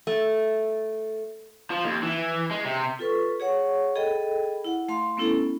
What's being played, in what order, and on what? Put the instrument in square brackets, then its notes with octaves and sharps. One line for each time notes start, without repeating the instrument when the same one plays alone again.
[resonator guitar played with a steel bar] A3
[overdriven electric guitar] F3
D#2
E3
G#3
C3
[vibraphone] F4 A4 B4 C#6
G#4 C#5 F#5 C#6
G#4 A4 D#5 G5 B5
E4 F#5
A3 F5 A5 C6
A3 B3 C#4 E4 A4